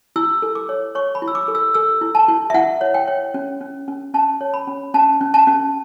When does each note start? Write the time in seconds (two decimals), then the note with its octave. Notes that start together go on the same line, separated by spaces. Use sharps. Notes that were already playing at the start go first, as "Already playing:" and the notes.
0.16 E4 E6
0.42 A4
0.55 D6
0.69 C#5
0.95 C#5 C#6
1.15 B5
1.22 E4
1.28 E6
1.35 D6
1.48 A4
1.55 E6
1.74 A4 E6
2.01 E4
2.15 A5
2.28 E4
2.50 E5
2.54 E4 F#5
2.81 C#5
2.94 G5
3.08 C#5
3.34 C#4
3.61 C#4
3.88 C#4
4.14 C#4 A5
4.41 C#5
4.54 B5
4.67 C#4
4.94 C#4 A5
5.21 C#4
5.34 A5
5.47 C#4